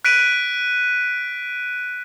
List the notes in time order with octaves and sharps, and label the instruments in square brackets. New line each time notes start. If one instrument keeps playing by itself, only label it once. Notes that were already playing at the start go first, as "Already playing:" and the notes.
[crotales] F#6 B6 D7 D#7